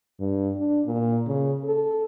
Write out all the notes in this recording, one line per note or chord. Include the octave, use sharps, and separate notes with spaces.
G2
D4
A#2
C#3
A4